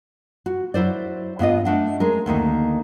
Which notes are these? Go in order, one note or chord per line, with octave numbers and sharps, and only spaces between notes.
F#4
F#3 E4 C5 D5
G2 B3 F4 D#5
A3 D4 F#5
G#3 C#4 A#4
D2 D#3 A#3 D#4